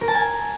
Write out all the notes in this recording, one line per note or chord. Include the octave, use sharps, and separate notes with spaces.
A#4
A5
G#5